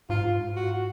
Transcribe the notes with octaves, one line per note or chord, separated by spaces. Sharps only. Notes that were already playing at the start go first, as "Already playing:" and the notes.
G#2 F4
F#4